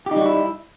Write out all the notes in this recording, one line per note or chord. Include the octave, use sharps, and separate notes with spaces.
G3 D#4 E4 F#4 G4